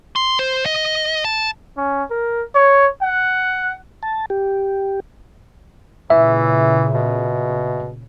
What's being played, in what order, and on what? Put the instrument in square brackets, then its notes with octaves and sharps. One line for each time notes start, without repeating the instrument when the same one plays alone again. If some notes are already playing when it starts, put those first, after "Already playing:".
[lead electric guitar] C6
C5
D#5
A5
[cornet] C#4
A#4
C#5
F#5
[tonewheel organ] A5
G4
[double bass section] A#2 C#3 [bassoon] E3 [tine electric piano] E5
[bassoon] B2